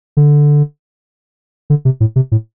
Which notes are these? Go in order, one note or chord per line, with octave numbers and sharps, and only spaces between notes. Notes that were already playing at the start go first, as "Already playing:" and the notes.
D3
D3
C3
A2
C3
A2